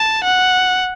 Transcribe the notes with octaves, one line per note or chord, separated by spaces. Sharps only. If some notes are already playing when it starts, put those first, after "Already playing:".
Already playing: A5
F#5